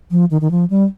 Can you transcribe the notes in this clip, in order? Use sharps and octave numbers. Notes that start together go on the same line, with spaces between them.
F3
D#3
D#3
F3
G3